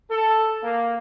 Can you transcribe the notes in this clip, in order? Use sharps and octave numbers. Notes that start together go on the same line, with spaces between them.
A4
A#3